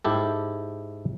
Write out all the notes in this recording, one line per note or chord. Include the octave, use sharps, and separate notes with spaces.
G#2 E4 G4 A4